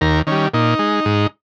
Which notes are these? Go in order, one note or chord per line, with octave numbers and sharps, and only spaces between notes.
D#2 A#4
D#3 G3 C#4
A#2 D#4
G#3
G#2